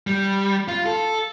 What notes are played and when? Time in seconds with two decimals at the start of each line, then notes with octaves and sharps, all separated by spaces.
0.07 G3
0.68 F4
0.86 A4